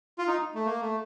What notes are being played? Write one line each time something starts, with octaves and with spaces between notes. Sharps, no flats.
F4
D#4
A3
A#3
A3